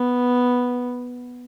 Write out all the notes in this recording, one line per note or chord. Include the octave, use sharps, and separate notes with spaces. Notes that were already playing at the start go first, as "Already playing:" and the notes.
Already playing: B3